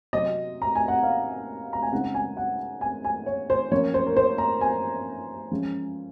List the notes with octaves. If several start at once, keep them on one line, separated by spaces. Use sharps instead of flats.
C3 F#3 C4 D#5
A#5
G#5
F#5
F5
A#5
G#5
C#3 G#3 C4 D#4 F#5
G#5
F#5
G#5
G#5
C#5
C5
F3 A#3 C#4 C#5
C5
A#4
C5
A#5
G#5
F3 G#3 C#4